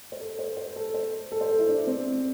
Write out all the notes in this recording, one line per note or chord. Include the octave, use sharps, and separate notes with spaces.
C5
A4
C5
C5
A4
C5
A4
C5
A4
E4
D4
C4